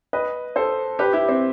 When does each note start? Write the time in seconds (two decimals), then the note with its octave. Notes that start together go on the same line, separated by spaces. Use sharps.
0.13 B4 D#5
0.56 A4 C5
0.99 G4 B4
1.13 E4 G4
1.28 C4